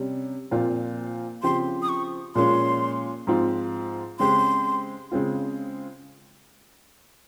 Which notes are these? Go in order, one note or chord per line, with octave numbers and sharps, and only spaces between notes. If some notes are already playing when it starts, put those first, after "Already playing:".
Already playing: C3 G3 C#4
A#2 F3 C4 F4
C#3 F3 C4 G4 C6
D#6
C#6
A#2 F3 G#3 C#4 F4 C6
G#2 F3 C4 F4
C#3 G#3 C4 G4 C6
C#3 G#3 C4 F4